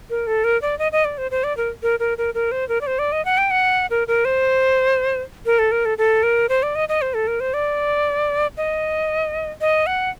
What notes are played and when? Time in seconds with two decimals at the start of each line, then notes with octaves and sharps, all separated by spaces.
0.10 A#4
0.27 A4
0.44 A#4
0.62 D5
0.79 D#5
0.92 D#5
1.05 D5
1.18 C5
1.31 C5
1.44 D5
1.57 A#4
1.83 A#4
2.00 A#4
2.18 A#4
2.34 A#4
2.52 C5
2.69 A#4
2.81 D5
2.87 C5
2.99 D5
3.12 D#5
3.25 F#5
3.38 G5
3.51 F#5
3.90 A#4
4.08 A#4
4.25 C5
5.46 A#4
5.59 A4
5.72 A#4
5.85 A4
5.98 A4
6.23 A#4
6.49 C5
6.63 D5
6.75 D#5
6.89 D#5
7.02 C5
7.14 A4
7.27 A#4
7.40 C5
7.54 D5
8.57 D#5
9.61 D#5
9.87 F#5